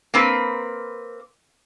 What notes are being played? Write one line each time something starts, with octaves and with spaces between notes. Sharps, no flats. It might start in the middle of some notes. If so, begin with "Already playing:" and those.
A#3 C4 B4